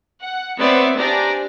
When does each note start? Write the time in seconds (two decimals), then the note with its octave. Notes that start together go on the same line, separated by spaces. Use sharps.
0.21 F#5
0.59 B3 C4 C#5 D5 E5
0.97 D4 G4 C5 D5 G#5 A#5